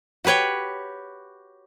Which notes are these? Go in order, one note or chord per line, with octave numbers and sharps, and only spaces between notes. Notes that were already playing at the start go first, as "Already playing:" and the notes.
F#4 G4 B4 C#5 G5